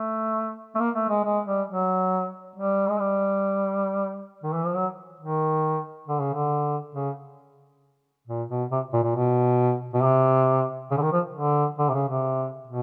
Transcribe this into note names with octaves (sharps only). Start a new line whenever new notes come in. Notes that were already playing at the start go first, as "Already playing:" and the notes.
Already playing: A3
A3
A#3
A3
G#3
G#3
G3
F#3
G3
G#3
G3
D#3
E3
F3
F#3
D#3
D3
C#3
D3
C#3
A#2
B2
C3
A#2
A#2
B2
B2
C3
C#3
D3
D#3
F3
D3
D3
C3
C#3
C3
B2